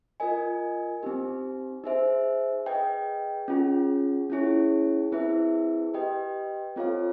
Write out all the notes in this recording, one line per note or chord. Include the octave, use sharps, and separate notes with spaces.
F4 A#4 D#5 G#5
C4 D#4 G4
D#4 G#4 C5 E5
G#4 B4 D#5 G5
C#4 F4 G#4
C#4 E4 G#4 C#5
C4 E4 G#4 B4 E5
G4 B4 D#5 G5
C4 F4 A4 C#5 F5